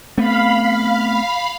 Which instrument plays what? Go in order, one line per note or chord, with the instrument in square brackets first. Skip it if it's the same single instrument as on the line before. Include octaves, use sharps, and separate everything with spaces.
[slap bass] A3 B3 C4 [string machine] F5 B5